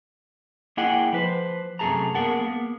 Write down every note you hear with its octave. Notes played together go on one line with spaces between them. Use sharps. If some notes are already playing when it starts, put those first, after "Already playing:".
A#3 E4 G#4 D#5 F#5 G5
F3 B4 C5
F#2 C3 A3 G#4 A5 A#5
A#3 B3 G#4 A#4 F#5 A5
A#3 B3